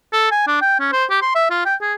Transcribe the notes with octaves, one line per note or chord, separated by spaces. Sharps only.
A4
G#5
D4
G5
C#4
C5
G4
C6
E5
F4
G5
G#4